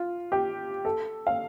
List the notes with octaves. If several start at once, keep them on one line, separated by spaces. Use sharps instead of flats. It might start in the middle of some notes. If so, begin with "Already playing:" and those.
Already playing: F4
G4
A4
F5